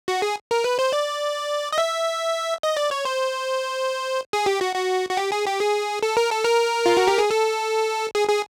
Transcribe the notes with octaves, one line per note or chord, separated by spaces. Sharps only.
F#4
G#4
A#4
B4
C5
D5
D#5
E5
D#5
D5
C#5
C5
G#4
G4
F#4
F#4
F#4
G4
G#4
G4
G#4
A4
A#4
A4
A#4
F4
F#4
G4
G#4
A4
G#4
G#4